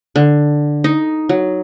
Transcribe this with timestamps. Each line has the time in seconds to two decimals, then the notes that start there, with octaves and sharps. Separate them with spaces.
0.16 D3
0.84 D#4
1.29 F#3